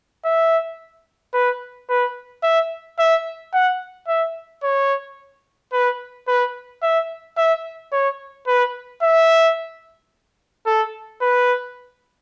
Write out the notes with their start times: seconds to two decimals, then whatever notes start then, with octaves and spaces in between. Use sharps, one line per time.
0.25 E5
1.34 B4
1.89 B4
2.43 E5
2.99 E5
3.54 F#5
4.08 E5
4.64 C#5
5.73 B4
6.28 B4
6.83 E5
7.37 E5
7.93 C#5
8.47 B4
9.03 E5
10.66 A4
11.22 B4